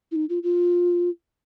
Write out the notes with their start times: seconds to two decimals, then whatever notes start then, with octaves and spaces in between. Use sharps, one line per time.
0.12 E4
0.16 D#4
0.29 F4
0.43 F4